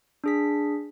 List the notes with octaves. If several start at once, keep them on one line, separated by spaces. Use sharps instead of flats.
D4 G#4 B6